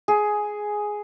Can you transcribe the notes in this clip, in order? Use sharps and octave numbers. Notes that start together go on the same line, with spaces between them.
G#4